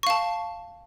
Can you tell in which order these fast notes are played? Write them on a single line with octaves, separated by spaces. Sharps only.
C#6 F5 A5